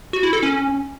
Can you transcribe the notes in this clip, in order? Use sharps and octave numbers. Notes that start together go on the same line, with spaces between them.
F#4
E4
A4
C#4